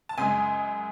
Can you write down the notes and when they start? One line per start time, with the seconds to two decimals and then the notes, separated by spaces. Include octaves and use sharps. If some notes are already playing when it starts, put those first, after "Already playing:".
0.09 A5
0.18 F#2 C#3 G#3 G#5